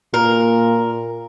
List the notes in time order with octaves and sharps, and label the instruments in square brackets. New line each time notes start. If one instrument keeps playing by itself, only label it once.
[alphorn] A#2 [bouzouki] A#4